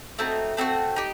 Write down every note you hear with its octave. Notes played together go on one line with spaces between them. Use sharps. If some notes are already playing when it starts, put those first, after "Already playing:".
A3 C4 D#4 F#4
A3 C4 D#4 F#4
D#4 G4